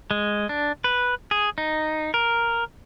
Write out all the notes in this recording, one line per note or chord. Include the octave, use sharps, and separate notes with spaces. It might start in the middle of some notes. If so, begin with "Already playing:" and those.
G#3
D4
B4
G#4
D#4
A#4